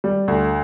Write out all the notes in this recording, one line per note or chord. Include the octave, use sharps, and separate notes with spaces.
G3
D2